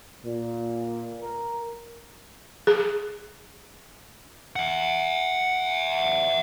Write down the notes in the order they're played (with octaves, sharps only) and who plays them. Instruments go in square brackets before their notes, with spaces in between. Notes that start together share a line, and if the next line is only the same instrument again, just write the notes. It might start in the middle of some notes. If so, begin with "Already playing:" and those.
[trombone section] A#2
A#4
[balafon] G#4
[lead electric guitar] E5 F#5